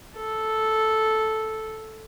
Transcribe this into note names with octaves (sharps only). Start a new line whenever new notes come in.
A4